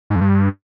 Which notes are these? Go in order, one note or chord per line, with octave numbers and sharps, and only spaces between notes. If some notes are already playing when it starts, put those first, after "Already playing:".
G#2
F2
G2